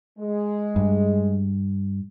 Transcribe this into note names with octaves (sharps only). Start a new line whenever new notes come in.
G#3
G2